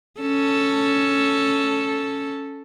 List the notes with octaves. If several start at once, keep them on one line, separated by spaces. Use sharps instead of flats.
C#4 A4